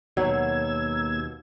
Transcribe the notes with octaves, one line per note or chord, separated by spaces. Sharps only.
D#2 B2 F#3 A#3 E6 G#6